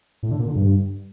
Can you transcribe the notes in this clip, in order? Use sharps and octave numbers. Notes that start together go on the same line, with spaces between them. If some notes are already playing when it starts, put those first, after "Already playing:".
A2
D3
A#2
D3
G2